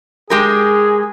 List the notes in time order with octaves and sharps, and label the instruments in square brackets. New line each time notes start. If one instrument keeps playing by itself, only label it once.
[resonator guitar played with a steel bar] G#3 G4 A#4 [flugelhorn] G#4